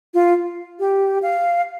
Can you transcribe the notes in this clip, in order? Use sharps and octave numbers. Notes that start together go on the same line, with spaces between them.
F4
G4
F5